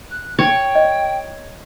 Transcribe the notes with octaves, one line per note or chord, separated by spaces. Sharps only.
F#6
C#5 G5
D#5